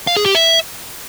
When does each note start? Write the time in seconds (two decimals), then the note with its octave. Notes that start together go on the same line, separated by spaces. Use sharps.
0.07 F5
0.16 G#4
0.26 G4
0.35 E5